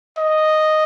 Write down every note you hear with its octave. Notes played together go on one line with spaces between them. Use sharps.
D#5